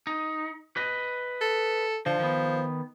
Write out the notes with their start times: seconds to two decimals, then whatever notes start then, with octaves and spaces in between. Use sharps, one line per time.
0.07 D#4
0.76 B4 D#5
1.41 A4
2.06 D3 F3
2.20 D#3 B3